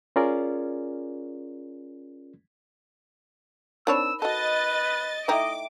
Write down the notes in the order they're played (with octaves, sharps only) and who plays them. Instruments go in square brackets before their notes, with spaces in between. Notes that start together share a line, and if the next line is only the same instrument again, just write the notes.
[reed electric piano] C#4 F4 G#4 A#4 D5
[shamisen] C4 D4 C#5 [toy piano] D#4 A#4 B5 [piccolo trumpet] E6
[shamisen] F#4 A4 [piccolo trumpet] B4 [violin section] D#5 A6
[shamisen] A3 D#4 E4 [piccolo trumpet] D#5 [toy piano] E5 G5 A#5 [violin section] D6